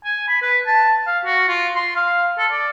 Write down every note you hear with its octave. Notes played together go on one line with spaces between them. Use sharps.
G#5
B5
B4
A5
F5
F#4
F4
C6
F5
A4
D5